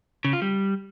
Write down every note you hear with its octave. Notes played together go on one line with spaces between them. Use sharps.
C#3
F4
G3